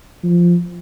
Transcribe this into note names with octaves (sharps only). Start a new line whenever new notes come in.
F3